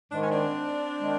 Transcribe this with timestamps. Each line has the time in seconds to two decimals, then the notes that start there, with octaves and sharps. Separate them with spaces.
0.12 G#2 D#3 G#3 D4
0.22 C#4
0.32 C4 D4
0.98 D#3 G#3